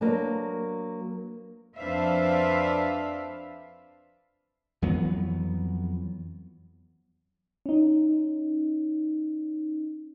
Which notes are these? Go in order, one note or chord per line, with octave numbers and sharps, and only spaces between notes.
F#3 A#3 B3 D4
F2 D4 B4 C5 E5 F5
F2 E3 F#3 B3
C#4 D#4